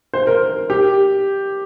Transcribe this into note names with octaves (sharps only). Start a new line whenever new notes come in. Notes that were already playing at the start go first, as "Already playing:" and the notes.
C5
A#4
G4